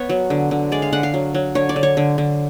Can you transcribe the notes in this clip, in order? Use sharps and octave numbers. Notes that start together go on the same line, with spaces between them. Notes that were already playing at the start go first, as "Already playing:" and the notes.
Already playing: B3 C#5
F#3
D3
D3
G#3 D5
F5
D3 F#5
F5
F#3
F#3
D3 C#5
D5
D3
C#5
D3
D3